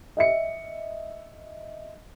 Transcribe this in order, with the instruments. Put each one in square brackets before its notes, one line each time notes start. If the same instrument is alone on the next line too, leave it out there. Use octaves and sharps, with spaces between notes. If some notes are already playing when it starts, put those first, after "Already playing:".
[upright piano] D#5 E5 C#7